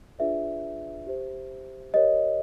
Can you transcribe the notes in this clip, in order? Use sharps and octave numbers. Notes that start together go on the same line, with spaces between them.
D4 F4 G#4 B4 D5 E5
G4 C5
G4 A#4 C#5 D#5